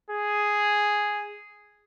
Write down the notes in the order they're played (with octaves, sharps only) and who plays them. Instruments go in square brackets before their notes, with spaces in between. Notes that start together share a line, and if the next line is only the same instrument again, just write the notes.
[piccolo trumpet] G#4